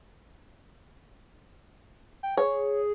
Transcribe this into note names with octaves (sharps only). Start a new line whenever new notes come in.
G5
G#4 C#5